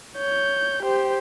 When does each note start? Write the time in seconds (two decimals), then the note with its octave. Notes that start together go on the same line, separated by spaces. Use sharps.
0.16 C#5 G6
0.83 G4 C5